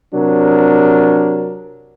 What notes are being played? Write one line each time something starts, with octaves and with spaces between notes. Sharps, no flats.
C3 F#3 D4 A#4